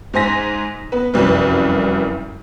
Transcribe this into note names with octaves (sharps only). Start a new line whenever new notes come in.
G#2 C5 G#5 A#6 B6
B3 B4
F1 C2 F#2 B4